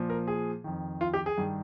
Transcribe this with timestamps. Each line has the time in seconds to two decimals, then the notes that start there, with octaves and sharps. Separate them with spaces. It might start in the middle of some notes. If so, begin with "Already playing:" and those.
Already playing: A#2 F3
0.10 A#4
0.27 G#4
0.64 F2 D#3
1.01 F4
1.14 G4
1.26 G#4
1.38 G2 D#3